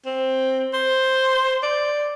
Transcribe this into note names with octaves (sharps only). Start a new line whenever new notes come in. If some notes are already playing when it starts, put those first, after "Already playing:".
C4
C5
D5